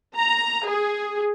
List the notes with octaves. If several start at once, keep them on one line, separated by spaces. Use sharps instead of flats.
A#5
G#4